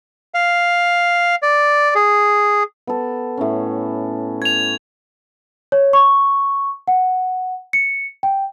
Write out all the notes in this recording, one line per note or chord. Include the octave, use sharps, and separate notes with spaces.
F5
D5
G#4
B3 A4
A2 C#4
C#6 G#6 F7
C#5
C#6
F#5
C#7
G5